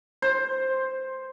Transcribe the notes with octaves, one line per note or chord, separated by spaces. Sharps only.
C5